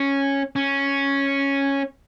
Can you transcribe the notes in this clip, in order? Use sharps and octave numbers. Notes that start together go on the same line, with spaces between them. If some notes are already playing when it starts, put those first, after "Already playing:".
Already playing: C#4
C#4